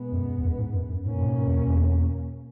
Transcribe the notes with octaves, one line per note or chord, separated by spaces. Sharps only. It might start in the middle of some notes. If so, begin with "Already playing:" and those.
Already playing: B2 G#3 B3
F#2
E2
F#2
G#2
F#2
F#2
G#2 B2 A#3 C#4
F#2
G#2
E2
E2